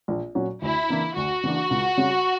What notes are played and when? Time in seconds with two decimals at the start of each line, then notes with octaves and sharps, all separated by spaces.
0.08 A#1
0.35 A#2 F#3 C#4 F#4
0.62 D2 E4
0.89 C#3 E3 A#3 D4
1.16 D2 F#4
1.43 C#3 E3 A#3 D4
1.70 C#2
1.97 C#3 G3 C#4